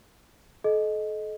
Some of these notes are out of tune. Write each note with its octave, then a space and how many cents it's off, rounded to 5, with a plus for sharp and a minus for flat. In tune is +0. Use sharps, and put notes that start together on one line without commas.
A4 -35 D#5 +0